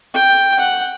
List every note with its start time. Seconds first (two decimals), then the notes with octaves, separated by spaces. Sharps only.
0.14 G5
0.59 F#5